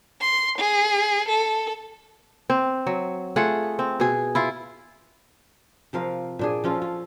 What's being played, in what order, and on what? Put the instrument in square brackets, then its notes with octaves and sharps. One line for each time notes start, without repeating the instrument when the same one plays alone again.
[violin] C6
G#4
A4
[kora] C4
F#3
A3 F4 G#4 F#5
C4
B2 G#4
E4 F4
C3 F3 A#4 F5
A#2 D4 G#4
F3 C#4 F4 A4
F4